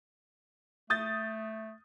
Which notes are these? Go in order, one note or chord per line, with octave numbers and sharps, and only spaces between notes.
A3 D#6 G6 A6